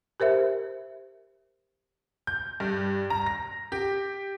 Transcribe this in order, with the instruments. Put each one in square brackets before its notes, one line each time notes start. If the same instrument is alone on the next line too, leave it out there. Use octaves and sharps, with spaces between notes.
[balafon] G4 A#4 C5 E5
[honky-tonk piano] G6
G2
A#5
A#6
G4